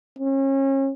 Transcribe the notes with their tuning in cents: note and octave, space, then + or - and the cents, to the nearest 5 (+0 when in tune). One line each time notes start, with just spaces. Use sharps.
C#4 -35